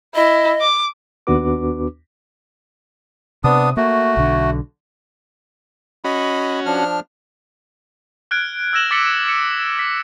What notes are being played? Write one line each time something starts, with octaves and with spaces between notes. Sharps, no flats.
E4 D#5
D6
D#2 B3 D4 F#4 B4 D6
C3 B3 D4 D#6
A3 A#3 F#4
B1 D3
C#4 F#4 D#5 B5
F3 D4 F6
F6 F#6 G#6 D7
E6 G#6 A#6 E7 F#7 G7
D6 A6 B6 C#7 F#7 G7
C#7
B6